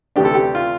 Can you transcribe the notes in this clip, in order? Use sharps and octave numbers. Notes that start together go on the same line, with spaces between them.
D2 C3 E3 A3 D4 G4
A4
G4
F4